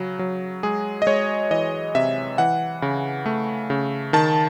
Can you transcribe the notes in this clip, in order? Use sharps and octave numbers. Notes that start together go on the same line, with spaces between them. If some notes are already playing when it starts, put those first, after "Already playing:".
Already playing: C#3 F#3
F#3
G#3 G#4
D#5
G#3 C#5
E3 D#5
C3 E5
E3 F#5
C#3
A3
C#3
D#3 A5